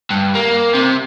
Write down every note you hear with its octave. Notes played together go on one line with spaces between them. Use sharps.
G2
A#3
C3